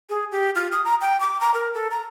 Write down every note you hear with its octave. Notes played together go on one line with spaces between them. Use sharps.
G#4
G4
F4
D#6
A#5
G5
D6
A#5
A#4
A4
A#5